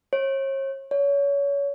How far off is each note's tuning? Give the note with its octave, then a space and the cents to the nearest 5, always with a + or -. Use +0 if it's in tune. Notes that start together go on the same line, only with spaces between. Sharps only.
C#5 -40
C#5 +25